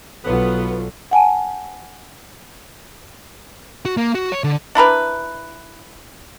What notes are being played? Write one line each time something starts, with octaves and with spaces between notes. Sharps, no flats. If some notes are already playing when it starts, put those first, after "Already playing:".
B1 F#3 B3 F4 A4
F#5 G#5 A5
F#4
A#3
F#4
C#5
D3
D4 E4 A#4 B4